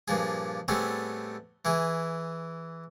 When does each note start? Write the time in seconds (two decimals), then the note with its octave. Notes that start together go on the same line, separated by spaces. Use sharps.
0.08 G2 A#2 F3 G#4
0.68 A2 G3 A3 B3 C4 G#4
1.65 E3 E4 G#4